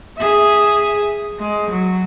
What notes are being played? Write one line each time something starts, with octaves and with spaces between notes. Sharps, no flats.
G#4 E5
G#3
F#3